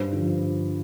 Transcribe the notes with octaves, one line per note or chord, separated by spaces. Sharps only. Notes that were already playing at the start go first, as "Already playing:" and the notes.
Already playing: G2 C5
D3 F3